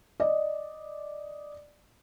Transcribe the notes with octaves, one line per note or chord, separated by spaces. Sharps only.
D5 D#5